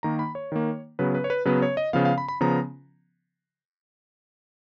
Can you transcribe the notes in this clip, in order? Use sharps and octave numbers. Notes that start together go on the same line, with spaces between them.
D#3 A#3 A#5
B5
C#5
D#3 A#3
C#3 F#3 B3 B4
B4
C#5
B4
C#3 F#3 B3 B4
C#5
D#5
C#3 F3 B3 F5
F5
B5
B5
C#3 F3 B3 A#5